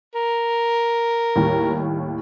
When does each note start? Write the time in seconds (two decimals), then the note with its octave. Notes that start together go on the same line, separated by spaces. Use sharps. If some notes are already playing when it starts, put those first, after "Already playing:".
0.15 A#4
1.36 D#2 A2 G3